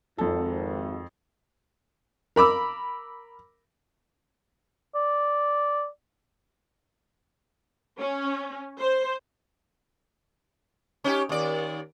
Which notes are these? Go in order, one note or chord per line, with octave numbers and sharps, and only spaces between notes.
G#1 F2 A4
A#4 B5 D6 E6
D5
C#4
C5
C#4 D#4 G4
D#2 D5